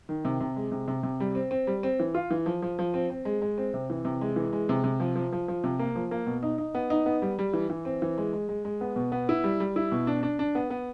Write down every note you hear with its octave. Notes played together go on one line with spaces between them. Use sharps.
D#3
C3
C3
G#3
C3
C3
C3
G3
C4
C4
G3
C4
E3
F4
E3
F3
F3
F3
C4
C4
G#3
G#3
C4
C3
E3
C3
G#3
E3
G#3
C3
C3
F3
F3
F3
F3
C3
A#3
F3
A#3
B2
D#4
D#4
B3
D#4
B3
G3
G3
E3
E3
C4
E3
G#3
G#3
G#3
G#3
B3
B2
B3
E4
G3
G3
E4
B2
D4
D4
D4
B3
B3